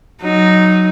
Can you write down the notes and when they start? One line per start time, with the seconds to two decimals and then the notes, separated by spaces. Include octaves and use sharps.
0.22 F#3 D#4